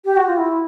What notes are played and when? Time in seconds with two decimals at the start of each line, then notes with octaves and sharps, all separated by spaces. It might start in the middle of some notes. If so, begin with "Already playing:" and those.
0.05 G4
0.16 F#4
0.27 F4
0.37 E4